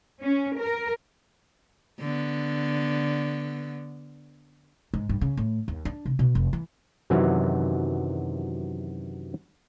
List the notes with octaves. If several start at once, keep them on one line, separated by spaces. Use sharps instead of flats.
C#4
A#4
D3 B3
G#2
G2
C#3
A2
D#2
D4
C3
B2
F1
E3
F#2 C3 D#3 E3 F#3